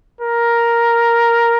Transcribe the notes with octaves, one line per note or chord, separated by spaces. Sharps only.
A#4